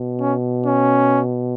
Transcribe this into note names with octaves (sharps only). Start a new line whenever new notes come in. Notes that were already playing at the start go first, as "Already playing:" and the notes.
Already playing: B2
C#4
C#4